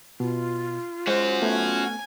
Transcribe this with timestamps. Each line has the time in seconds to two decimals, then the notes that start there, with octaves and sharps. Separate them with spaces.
0.20 B2 F4
1.07 G#3 C#4 F#4 C5
1.42 A3 B3 G#5